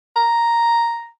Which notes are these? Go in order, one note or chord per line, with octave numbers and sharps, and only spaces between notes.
A#5